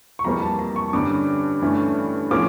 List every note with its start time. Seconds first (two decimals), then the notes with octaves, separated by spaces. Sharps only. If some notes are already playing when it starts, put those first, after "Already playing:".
0.19 C#6
0.24 F2 E3 G3 A#3 A#5
0.42 A5
0.59 A#5
0.76 C#6
0.93 G2 D3 G3 C#4 D6
1.62 G2 E3 A3 C#4
2.31 A2 F3 A#3 C#4 D6